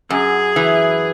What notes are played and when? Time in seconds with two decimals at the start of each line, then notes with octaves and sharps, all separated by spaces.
0.10 F#2 G#4
0.56 E3